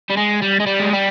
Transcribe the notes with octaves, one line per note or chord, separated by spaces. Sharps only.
G3
G#3
G3
G#3
G3
G#3
G3